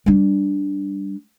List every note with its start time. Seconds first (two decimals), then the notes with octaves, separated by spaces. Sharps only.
0.06 G3 D4